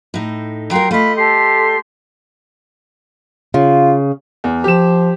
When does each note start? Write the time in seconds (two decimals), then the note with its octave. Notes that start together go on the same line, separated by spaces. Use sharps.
0.14 A2 D#4
0.71 F#3 F4 A#4 G5 C6
0.91 A3 F4 D#5 B5
1.16 G4 A4 C6
3.54 C#3 F4
4.44 E2
4.64 F3 G4 E7